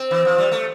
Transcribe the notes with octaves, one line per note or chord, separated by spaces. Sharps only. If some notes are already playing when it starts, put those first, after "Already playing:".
Already playing: C4
E3
F3
G3
A3